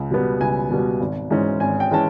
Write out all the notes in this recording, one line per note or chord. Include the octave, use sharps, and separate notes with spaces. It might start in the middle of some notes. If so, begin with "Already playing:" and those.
Already playing: C#2
B2 G3 B3
C#2 G#5
B2 G3 B3
G#1
G#2 E3 G#3 C#4
G#1 G#5
G5
E3 G#3 C#4 A5